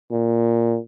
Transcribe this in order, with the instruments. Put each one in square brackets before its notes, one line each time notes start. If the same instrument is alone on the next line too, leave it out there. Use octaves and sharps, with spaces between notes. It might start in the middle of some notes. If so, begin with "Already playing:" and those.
[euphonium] A#2